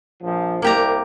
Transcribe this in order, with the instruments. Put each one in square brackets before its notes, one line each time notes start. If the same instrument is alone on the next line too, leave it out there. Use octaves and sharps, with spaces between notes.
[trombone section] A#1 F3
[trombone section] C2 [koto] A#3 G4 A#5